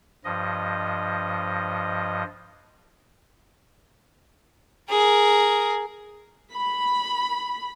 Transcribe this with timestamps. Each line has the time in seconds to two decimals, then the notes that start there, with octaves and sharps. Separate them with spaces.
0.25 G2 F3 D#5
4.90 G#4 A#4
6.53 B5